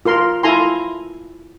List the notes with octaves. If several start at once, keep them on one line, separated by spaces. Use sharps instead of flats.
F4 A#4 C6
E4 F4 A4 G#5 A#5 C6